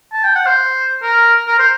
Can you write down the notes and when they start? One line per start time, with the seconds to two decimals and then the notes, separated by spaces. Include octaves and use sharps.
0.13 A5
0.24 G5
0.35 F#5
0.46 C5
1.03 A#4
1.48 A#4
1.59 C5